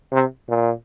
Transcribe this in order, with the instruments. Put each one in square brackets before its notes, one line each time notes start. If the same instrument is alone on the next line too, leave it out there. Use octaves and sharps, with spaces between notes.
[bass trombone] C3
A#2